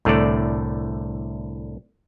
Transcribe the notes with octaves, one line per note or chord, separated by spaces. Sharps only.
C2 A2 D3 A3 D5